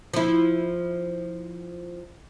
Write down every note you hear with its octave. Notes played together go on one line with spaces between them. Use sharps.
F3 E4